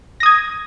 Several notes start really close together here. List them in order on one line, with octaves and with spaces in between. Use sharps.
A#6 D#6 G#6